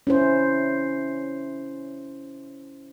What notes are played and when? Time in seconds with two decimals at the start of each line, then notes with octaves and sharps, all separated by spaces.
0.07 C#4 E4 C5